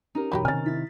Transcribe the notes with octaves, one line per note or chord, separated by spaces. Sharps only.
C#4 D#4 G4 A#4
E1 F3 F#4 G4 C#5 B5
C3 D#3 C#4 G#5 F6 A6
E4 A6 B6